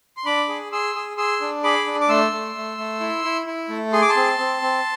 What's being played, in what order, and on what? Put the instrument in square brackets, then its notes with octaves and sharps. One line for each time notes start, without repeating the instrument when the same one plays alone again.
[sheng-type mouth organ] C6
D4 B5 D6
G#4
G#4 C6 E6
G#4
G#4 C6 E6
D4
G#4 B5 D6
D4
D6
A3 C6 E6
A3
A3
A3
E4
E4
E4
A3
G#4 C6
D6
A5 C6
C4
C4
C4